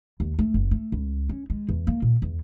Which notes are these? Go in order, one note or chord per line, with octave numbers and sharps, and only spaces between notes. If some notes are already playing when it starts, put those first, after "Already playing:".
D#2
A3
F#1
A3
C#2
C#4
G#3
E2
A#3
A#2
E2